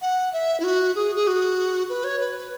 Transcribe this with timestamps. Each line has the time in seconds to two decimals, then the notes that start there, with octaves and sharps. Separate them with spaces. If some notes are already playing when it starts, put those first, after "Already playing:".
0.01 F#5
0.33 E5
0.60 E4
0.64 F#4
0.96 G#4
1.16 G#4
1.27 F#4
1.89 B4
2.04 C#5
2.20 B4